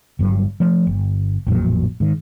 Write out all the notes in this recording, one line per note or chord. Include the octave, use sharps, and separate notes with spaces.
G1 G2 F#3 G3
F3 A3
G1
A1 F2 A#2 F#3
G#2 D#3